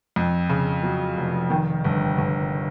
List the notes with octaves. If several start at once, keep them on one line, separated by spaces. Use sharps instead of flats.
F2
C#3
F#3
F1
D#3
G1
G1